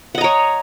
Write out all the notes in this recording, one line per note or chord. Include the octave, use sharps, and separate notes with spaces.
C#5 D#5 F#5 A#5